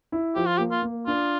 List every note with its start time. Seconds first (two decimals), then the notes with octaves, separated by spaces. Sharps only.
0.12 E4
0.35 F3 G4
0.46 F4
0.57 A#3 G4
0.71 F4
0.83 A#3
1.07 D4 F4